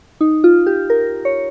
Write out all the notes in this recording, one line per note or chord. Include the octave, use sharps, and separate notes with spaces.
D#4
F4
G4
A#4
C#5